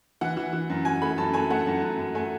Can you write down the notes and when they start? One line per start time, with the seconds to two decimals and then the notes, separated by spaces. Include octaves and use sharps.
0.21 E3 F#5
0.37 E3
0.53 E3
0.70 F#2
0.85 F#2 G#5
1.02 A3 B5
1.18 F#2 A5
1.33 A3 G#5
1.50 A3 F#5
1.67 F#2
1.83 F#2
1.99 F#2
2.15 A3 G#5